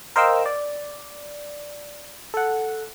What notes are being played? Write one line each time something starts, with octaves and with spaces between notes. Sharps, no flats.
A#4 C5 D#5 F5 G5 E6
D5
A4 F#5